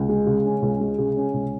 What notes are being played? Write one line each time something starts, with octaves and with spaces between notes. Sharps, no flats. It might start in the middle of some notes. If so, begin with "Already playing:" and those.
Already playing: C#2
G#3
C#3
C#4
C#2
G#3
C#3
C#4
C#2